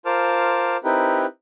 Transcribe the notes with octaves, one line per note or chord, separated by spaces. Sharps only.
F4 A#4 C5 A5 D6 F6
C4 D#4 E4 G4 A#4 B4